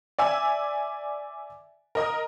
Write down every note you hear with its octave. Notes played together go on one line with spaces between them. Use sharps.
D5 E5 G#5 E6
A#4 D#5 D#6